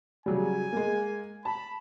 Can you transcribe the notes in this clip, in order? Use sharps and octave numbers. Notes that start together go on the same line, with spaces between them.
C#3 F#3 G3 G#5
G#3 A#3
A5 B5